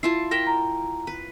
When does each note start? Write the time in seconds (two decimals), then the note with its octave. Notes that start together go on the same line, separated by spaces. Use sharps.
0.03 E4 F4 A5 C7
0.31 A#4 G5 A5 A#6 B6
0.47 A#5
1.07 B4